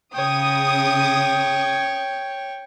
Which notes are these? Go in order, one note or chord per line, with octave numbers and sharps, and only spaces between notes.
C#3 C#5 G5 D#6